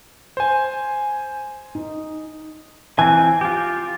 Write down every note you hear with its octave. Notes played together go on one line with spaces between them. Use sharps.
C5 G#5
D#4
E3 C4 G#5
F4 G4